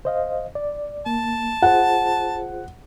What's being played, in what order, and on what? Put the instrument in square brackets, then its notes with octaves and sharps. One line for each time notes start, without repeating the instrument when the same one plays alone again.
[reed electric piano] C5 D#5 F5
D5
[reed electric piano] A#3 [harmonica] A5
[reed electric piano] F4 G#4 C5 [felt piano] F#5